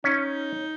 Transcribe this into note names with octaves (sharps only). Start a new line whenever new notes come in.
C#4 D#4